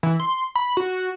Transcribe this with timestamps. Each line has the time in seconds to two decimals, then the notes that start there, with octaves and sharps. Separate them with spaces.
0.03 E3
0.20 C6
0.55 B5
0.77 F#4